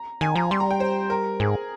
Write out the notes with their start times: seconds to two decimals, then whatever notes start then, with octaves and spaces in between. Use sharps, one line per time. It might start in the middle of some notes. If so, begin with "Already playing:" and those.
Already playing: A#5
0.21 D#3 G#5
0.35 F3 A#5
0.51 G3 C6
0.60 A#5
0.71 G5
0.80 C5
1.10 A#4
1.40 G#2 G#4